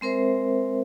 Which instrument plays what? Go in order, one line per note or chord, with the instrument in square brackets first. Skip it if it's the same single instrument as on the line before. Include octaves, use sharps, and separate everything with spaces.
[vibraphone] G#3 C4 A#4 C5 E5